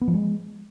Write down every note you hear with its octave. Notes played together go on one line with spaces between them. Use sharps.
B3
F3
G#3